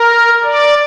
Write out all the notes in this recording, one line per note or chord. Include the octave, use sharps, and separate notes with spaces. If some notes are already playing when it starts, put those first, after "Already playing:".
Already playing: A#4
D5